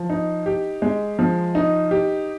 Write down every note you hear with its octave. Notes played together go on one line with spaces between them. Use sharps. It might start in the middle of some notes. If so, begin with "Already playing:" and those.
Already playing: F3
D#4
G4
G#3
F3
D#4
G4